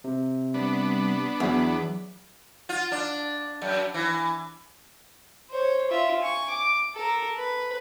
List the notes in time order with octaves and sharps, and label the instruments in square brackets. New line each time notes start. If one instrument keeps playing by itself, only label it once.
[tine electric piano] C3
[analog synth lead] G3 [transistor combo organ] B3 D4
[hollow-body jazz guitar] E2 [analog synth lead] F#3
[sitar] F4
D4
F#2
E3
[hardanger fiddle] C5 C#5
F4 E5
G#5 C#6
D6
A4 A#4
B4